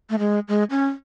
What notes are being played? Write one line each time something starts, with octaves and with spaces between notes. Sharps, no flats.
A3
G#3
G#3
C#4